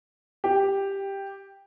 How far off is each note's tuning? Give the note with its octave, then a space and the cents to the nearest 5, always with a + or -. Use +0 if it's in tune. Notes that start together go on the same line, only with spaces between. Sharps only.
G4 +5